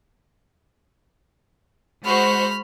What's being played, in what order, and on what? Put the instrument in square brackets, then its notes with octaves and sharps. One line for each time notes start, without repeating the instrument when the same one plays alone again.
[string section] G#3 F#4 C5 [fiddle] B5 F6